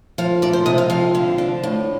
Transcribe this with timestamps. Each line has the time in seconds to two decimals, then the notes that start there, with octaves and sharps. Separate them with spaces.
0.18 F3 F5
0.42 C3 D5
0.53 C5
0.66 C3 D#5
0.78 F5
0.90 F3 F5
1.15 D3
1.38 D4
1.63 A2